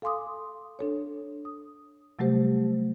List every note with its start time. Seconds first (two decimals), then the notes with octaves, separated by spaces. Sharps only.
0.02 A4 F5 G#5 C6 D6 D#6
0.79 D4 A4 C#5
1.45 D#6
2.19 C3 F#3 G3 A3 G4 C5